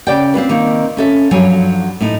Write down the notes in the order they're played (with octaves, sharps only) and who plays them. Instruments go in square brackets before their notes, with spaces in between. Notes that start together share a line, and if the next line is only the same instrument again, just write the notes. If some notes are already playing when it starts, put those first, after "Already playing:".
[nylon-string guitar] C#3 D5 G5
C4 C#4 F4 B4
D#3 A#3 C4 D#4
C#4 A4 E5
G2 F3 F#3 C#5 G#5
A2 D#4